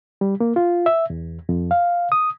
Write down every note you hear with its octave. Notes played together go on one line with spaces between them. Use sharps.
G3
A#3
F4
E5
E2
F2
F5
D#6